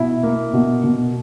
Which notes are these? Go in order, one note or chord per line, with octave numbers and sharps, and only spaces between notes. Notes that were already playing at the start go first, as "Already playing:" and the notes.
Already playing: B2 E4
A#3
B2
B2